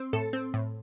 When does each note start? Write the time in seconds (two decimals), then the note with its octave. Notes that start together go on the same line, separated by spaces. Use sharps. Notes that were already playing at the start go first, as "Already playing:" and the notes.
Already playing: C4
0.13 A2 A4
0.33 C4
0.54 A2